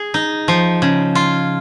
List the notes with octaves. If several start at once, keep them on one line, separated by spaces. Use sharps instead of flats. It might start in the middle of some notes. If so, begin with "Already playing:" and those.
Already playing: G#4
D#4
F3
C#3
F4